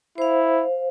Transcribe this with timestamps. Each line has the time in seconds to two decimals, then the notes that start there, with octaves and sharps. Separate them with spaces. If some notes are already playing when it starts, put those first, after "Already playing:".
0.18 E4 C5 F5